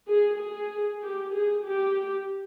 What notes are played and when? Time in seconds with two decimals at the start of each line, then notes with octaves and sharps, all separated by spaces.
0.08 G#4
0.39 G#4
1.02 G4
1.32 G#4
1.63 G4